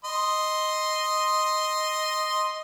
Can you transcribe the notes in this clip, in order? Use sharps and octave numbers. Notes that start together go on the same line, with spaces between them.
D#5 C6